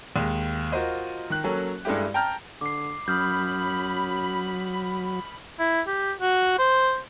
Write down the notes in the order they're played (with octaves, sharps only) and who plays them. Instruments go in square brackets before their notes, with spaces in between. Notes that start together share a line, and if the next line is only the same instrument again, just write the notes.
[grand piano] D#2 G#3
F4 F#4 A#4 C5 D#5
D#3 F#6
F#3 A#3 C#4 A4
G2 G#3 A3 E4 G4
G5 A5 A#5 F6 G6
[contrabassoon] D3 [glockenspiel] D6 C7
[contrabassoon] F#2 [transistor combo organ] F#3 [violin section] B5 [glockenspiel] D#6 F6 G6
[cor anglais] E4
G4
F#4
C5